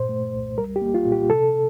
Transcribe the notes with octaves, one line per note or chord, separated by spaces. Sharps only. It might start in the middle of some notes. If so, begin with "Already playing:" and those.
Already playing: G2 A#2 C5
A3
C2
G3 A#4
G4
A#3
F4
A#2
G4
C3 A4